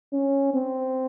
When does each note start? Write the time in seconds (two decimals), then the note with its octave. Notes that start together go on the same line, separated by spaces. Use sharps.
0.13 C#4
0.54 C4